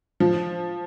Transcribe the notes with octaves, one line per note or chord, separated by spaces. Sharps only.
F3